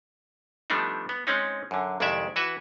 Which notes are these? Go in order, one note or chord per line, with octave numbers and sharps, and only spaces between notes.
F3 G3 A3 B3 D4 D#4
B3
G#3 C4 C#4 D#4
F#2 D3
C2 F2 D#3 G#3 D5 E5
E3 F#4 B4 E5